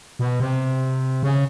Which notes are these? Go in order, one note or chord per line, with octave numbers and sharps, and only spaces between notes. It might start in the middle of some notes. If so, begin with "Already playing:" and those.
B2
C3
C#3